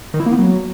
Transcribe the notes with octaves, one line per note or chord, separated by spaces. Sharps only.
D#3
E4
A#3
B3
F#3